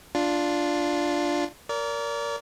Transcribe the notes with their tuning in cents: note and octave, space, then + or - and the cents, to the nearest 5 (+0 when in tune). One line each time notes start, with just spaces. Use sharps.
D4 +0 F4 +0
A#4 +0 D5 -35